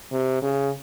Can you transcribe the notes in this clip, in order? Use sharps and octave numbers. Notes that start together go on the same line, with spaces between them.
C3
C#3